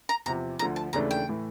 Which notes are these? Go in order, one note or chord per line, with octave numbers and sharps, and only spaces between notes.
A#5
E2 C3 F3 A#5
D2 D3 F3 A#5
A5
D#2 C#3 E3 A3 D4 A#5
G5
A2 E3